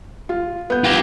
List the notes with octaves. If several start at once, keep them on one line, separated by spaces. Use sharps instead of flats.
F4
B3 G6
F4 G4